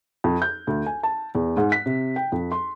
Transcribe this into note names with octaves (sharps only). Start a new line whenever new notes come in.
F2
G6
D2
G#5
A5
E2
G#2
B6
C3
G5
F2
C6